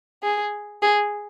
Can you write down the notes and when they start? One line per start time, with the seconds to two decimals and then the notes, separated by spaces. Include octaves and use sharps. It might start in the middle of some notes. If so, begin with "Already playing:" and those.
0.23 G#4
0.82 G#4